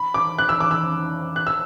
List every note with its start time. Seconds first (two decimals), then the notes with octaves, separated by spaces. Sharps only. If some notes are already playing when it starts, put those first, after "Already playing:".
Already playing: B5
0.14 D6
0.39 F#6
0.49 E6
0.60 D6
0.71 E6
1.36 F#6
1.47 E6